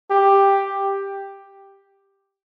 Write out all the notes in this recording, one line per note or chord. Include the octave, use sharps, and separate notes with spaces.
G4